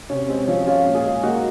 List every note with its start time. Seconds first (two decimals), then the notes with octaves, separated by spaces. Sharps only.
0.10 C3 C#4
0.29 G#3 C4
0.48 F3 C#4
0.66 G#3 C#4 F4
0.86 A#2
0.95 F4 G#4
1.05 G#3
1.23 A#3 D#4 F#4